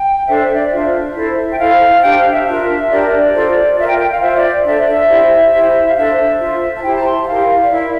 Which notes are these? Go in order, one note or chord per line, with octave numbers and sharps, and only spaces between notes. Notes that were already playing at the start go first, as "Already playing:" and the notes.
Already playing: G5
D4 A4 C5 E5
E5
D5
D4 F4 C5 E5
E4 A4 C5
G5
E4 A4 C5 F5
D4 G4 C5 G5
F5
E5
D4 F4 A#4
D4 G4 A#4 D5
D5
F4 A4 C5
D5
F4 A#4 E5
G5
G5
F5
F4 C5 E5
D5
D4 A4 C5 E5
D5
E5
E4 G4 C5
E4 G4 C5
F5
D4 A4 C5 E5
F4 C5
A5
E4 G4 C5 G5
A5
A#5
C6
G5
E4 G4 A#4 F5
D5
E4 A#4 E5